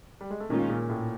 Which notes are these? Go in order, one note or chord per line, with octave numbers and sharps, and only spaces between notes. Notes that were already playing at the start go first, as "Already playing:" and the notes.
G3
G#3
A3
A#2 D#3 G#3 A#3 C#4 F4
A#2 A#3
A2 A3